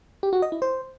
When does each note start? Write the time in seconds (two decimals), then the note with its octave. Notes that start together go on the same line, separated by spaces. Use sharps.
0.23 G4
0.33 F#4
0.42 D#5
0.52 E4
0.62 C5